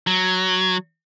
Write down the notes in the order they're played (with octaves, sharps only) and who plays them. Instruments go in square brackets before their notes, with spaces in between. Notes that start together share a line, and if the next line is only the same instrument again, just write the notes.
[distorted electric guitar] F#3